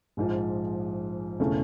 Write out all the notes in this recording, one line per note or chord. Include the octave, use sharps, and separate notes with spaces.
A#1 G#2 F3
E1 C#3 E3 A3